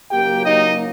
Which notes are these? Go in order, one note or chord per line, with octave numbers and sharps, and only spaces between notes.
F#1 F#2 F#3 A#3 G4 G5
D#4 D#5